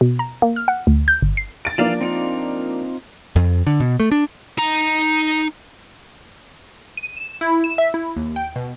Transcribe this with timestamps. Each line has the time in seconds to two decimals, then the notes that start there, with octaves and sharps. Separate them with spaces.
0.01 B2
0.19 A#5
0.42 A#3
0.56 F6
0.68 F#5
0.87 D2
1.08 G6
1.22 G1
1.37 C7
1.65 A6 D7
1.78 E3 F3 A#3 D4 D5 F5
2.01 C4 D#4 F4
3.36 F2
3.67 D3
3.80 B2
4.00 A3
4.12 D4
4.58 D#4 A#5
6.97 D#7
7.16 E7
7.41 E4
7.64 E7
7.78 E5
7.94 E4
8.16 D#2
8.36 G5
8.56 B2